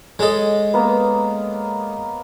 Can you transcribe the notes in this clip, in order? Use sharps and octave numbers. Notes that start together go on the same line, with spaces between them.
G#3 A4 C#5 D#5
A#3 B3